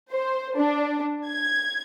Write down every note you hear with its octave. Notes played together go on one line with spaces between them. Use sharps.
C5
D4
G#6